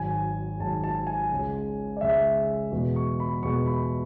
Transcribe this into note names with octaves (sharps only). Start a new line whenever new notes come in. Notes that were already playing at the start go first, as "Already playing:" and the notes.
Already playing: G#1 G#2 F#3 G#5
G#1 G#2 F#3 A5
A5
G#5
C#2 C#3 G#3
D5
C#2 C#3 G#3 E5
E2 B2 G#3
C#6
B5
E2 B2 G#3 C#6
B5